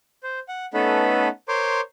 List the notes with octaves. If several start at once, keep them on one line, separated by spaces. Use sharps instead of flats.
C5
F#5
A3 B3 C#4 D#4 A4 B4
A#4 C5 C#5 C6 D6